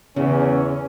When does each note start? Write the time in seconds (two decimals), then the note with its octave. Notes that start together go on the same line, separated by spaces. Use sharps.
0.16 E2 C#3 C#4